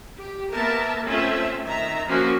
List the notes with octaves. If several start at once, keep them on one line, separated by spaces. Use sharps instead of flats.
G4
A#3 B3 A#4 E5 A5
A3 C4 C#4 F4 E5
D#3 E5 A#5
F3 A#3 C#4 F#4 A#4